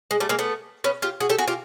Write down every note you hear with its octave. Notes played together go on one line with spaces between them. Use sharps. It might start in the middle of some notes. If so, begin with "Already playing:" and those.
G#3
G3 A3
G#3 A#3
A3 B3
B3 C#4
F4 G4
F#4 G#4
G4 A4
F#4 G#4
F4 G4